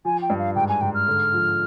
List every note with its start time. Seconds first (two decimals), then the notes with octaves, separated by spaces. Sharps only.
0.05 F3 G#5
0.22 G5
0.30 G2
0.39 F5
0.55 G#2 G5
0.69 G#5
0.81 G#2 G5
0.94 F6
1.08 D3
1.33 F3